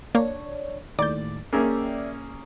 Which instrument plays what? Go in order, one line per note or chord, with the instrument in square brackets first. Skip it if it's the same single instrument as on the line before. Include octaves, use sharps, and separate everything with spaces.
[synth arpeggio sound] A#3 [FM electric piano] D4 C#5
[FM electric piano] D#2 A2 [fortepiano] D5 [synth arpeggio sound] D6 G6
[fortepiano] A#3 C#4 G#4 [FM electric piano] D5 E5 G5